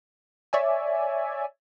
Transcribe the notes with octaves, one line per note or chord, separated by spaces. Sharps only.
C#5 D5 E5 G#5